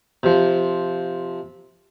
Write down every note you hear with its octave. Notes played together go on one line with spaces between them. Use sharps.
C3 F3